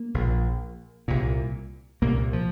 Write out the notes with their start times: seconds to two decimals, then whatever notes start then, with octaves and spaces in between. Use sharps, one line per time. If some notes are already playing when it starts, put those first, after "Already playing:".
Already playing: A#3
0.14 A#1 A#2
1.08 C2 A#2
2.02 C2 A#2 A#3
2.33 F3